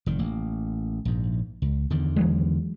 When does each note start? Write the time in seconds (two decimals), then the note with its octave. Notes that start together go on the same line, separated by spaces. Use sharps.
0.06 F1 D#3
0.19 A1 A#3
1.05 A#1 G#2
1.62 C#2
1.90 E2 D3 D#3
2.16 E3 F#3 G#3